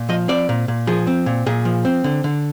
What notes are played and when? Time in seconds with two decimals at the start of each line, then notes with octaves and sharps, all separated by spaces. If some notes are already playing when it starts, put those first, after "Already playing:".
Already playing: A#2
0.09 F3 D#5
0.28 C4 D5
0.49 A#2
0.68 A#2
0.87 F3 G#4
1.07 C4
1.26 A#2
1.46 A#2 G#4
1.65 F3
1.85 C4
2.04 D3
2.24 D3